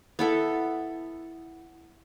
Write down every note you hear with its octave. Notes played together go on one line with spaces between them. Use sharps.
B3 E4 A4